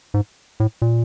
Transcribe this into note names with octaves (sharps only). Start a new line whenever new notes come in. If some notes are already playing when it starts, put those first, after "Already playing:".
G#2
A2
A#2